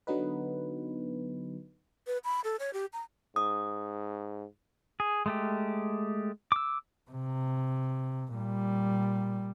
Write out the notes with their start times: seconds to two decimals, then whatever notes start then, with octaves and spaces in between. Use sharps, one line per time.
0.07 D3 F#3 B3 D#4 B4
2.07 B4
2.24 B5
2.44 A4
2.60 C#5
2.73 G4
2.93 A#5
3.36 G#2 D#6
5.00 G#4
5.26 G#3 A3 G4
6.52 D6 E6
7.11 C3
8.35 A#2 G3